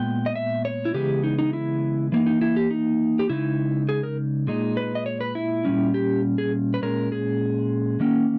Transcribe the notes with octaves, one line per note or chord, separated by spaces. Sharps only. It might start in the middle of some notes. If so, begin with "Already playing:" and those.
Already playing: A#2 G#3 B3 G5
D#5
E5
C#5
E4
C#3 E3 G#3 B3 G4
D#4
D#4
E4
E3 A#3 D#4
D#4
E4
G4
D#4
G4
C#3 G#3 D#4 E4
G#4
A#4
A#2 G#3 D#4
B4
D#5
C#5
B4
E4
A#2 G3 C#4
G4
G#4
B4
A#2 G#3 C#4 A#4
G#4
D#3 A#3 C#4